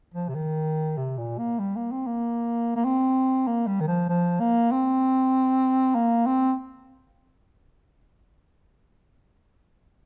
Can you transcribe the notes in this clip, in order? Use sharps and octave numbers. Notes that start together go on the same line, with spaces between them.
F3
C3
D#3
C3
A#2
A#3
G3
A#3
C4
A#3
A#3
C4
A#3
G3
D#3
F3
F3
A#3
C4
A#3
C4